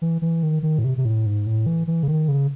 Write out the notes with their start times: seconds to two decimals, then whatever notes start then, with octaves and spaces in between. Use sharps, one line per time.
0.02 E3
0.22 E3
0.43 D#3
0.63 D#3
0.78 A2
0.84 C3
0.98 C3
1.05 A2
1.26 G#2
1.47 A2
1.66 E3
1.87 E3
2.03 C#3
2.08 D#3
2.28 C#3